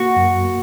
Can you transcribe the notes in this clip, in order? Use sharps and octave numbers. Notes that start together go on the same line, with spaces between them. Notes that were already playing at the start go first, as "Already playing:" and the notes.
Already playing: A#3 F#4
F#2
A#3